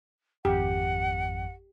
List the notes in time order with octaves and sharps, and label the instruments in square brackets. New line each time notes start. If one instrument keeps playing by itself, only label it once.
[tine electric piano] G#1 F2 [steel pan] G4 [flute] F#5